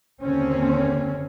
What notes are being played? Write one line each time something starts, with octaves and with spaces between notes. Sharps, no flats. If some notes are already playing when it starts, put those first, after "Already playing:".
F#1 D#2 D3 C4 C#4